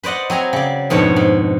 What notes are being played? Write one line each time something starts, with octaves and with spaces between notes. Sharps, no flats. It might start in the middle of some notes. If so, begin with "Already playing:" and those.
B4 C5 D5 D#5 F#5
F#3 C4 G#5 A#5
C#3 D5
F2 G#2 B2 D4 C#5
G#2